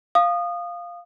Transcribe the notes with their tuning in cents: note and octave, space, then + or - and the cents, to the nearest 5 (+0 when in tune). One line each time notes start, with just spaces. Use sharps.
F5 +0 D#6 -25